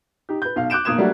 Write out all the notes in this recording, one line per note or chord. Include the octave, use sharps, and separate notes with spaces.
D#4 G4
B4 G6
B1 F5
D6 F#6 G6 D7 E7
B1 A#3 D#6 G#6 E7
F#3 G3 A3 A#3 D4 F#4